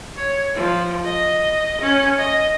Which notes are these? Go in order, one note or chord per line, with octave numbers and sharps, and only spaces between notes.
C#5
F3
D#5
C#4
D#5